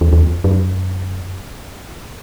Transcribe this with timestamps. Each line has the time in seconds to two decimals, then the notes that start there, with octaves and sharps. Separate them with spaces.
0.01 E2
0.13 E2
0.44 F#2